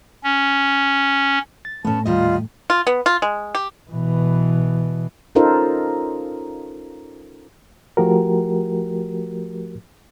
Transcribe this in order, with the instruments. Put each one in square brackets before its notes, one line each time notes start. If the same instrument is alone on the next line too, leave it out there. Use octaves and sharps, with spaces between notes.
[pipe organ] C#4
[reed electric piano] A6
[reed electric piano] A2 A3 [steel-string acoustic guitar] B3 C#4 [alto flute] A5
[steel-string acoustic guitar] D#2 G3 D#5 [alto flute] F4
[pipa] F4
B3
F4
G#3
G4
[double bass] B2 E3
[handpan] C#4 D#4 F4 A4 A#4 C5
[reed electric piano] F3 A3 F#4 G4 A#4